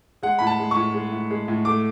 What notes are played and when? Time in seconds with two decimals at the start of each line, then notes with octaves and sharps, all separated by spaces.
0.23 G#3 F#5
0.39 A2 B5
0.47 A5
0.59 G#3
0.71 A2 C#6
0.94 G#3
1.12 A2
1.30 G#3
1.48 A2
1.65 A3 D6